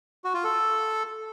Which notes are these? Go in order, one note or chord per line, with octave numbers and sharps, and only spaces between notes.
F#4
F4
A4